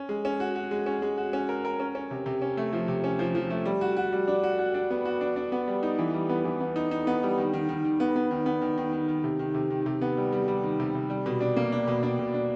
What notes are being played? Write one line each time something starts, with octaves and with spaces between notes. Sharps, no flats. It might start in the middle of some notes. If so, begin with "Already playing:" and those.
Already playing: C#4
G#3
C#4
F#4
F#4
G#3
C#4
G#3
F#4
C#4
A#4
A#4
C#4
C#4
C3
C3
C#4
A3
F3
C3
C#4
F3
F3
A3
G3
F#4
F#4
G3
D4
F#4
F#4
D4
B3
F#4
D4
D4
B3
G3
D#4
E3
G3
B3
E3
B3
D#4
D#4
B3
G3
D#3
D#3
D#3
D#3
B3
B3
D#3
B3
D#3
D#3
D#3
D#3
C3
D#3
C3
D#3
C3
B3
G3
G3
G3
D#3
C3
C3
G3
B2
D4
A#3
D4
B2
D4
B2
D4